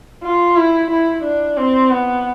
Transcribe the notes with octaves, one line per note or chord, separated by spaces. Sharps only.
F4
E4
E4
D4
C4
B3